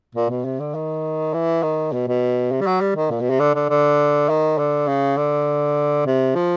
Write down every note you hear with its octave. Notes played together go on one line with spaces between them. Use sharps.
A#2
B2
C3
D3
D#3
E3
D#3
B2
B2
C3
G3
F#3
G3
D#3
A#2
B2
C3
D3
D3
D3
D#3
D3
C#3
D3
C3
F3